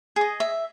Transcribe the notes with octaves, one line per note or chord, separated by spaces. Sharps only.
G#4 D#5
E5